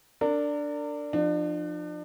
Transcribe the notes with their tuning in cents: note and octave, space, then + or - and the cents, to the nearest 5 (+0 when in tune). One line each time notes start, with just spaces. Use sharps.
D4 +0 A#4 -40
F3 +0 D4 +40